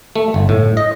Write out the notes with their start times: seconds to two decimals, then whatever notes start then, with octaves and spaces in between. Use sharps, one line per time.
0.15 A3
0.34 G1
0.49 A2
0.77 D#5